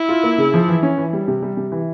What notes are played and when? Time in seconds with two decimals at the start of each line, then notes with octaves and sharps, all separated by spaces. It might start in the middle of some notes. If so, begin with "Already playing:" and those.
Already playing: E4
0.09 F4
0.23 A#3
0.38 C#3
0.54 F3
0.68 E3
0.83 C#4
0.98 E3
1.13 G3
1.28 C3
1.42 G3
1.57 C3
1.72 E3